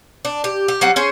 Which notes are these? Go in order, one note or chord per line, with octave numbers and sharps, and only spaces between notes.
D4
G4
G4
F#3 G3 C4 F#5
C#4 G#4 C5